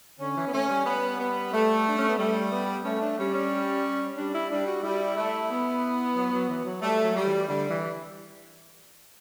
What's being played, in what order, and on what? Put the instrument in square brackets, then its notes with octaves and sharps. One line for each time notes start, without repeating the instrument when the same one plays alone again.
[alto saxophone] D3 [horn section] C#4
[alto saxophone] E3
B3
[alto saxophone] A3 [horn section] C#4
[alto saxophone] G3
[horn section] B3
B3
A3
[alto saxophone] D4
C#4
B3
[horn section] G3 [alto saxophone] A3
[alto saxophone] B3
[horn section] A3 [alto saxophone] C#4
[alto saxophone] D4
[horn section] G3 [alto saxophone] C#4
[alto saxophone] C#4
[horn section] G3 [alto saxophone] D4
[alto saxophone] E4
[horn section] G3 [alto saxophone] D4
[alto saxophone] F#4
[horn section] G3 [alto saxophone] E4
[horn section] A3
B3
[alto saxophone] F#3
F#3
E3
F#3
[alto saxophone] G3 [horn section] A3
[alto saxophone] F#3
[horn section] G3
[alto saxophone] E3
[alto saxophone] D3 [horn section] G3
[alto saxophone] E3